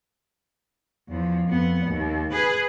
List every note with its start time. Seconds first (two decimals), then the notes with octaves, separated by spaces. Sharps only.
1.09 E2 F3
1.48 F2 B3
1.86 D#2
2.32 G#4 B4